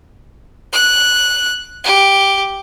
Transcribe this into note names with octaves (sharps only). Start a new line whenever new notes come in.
F#6
G4